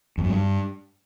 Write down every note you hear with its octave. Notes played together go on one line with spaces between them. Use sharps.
F2
F#2
G2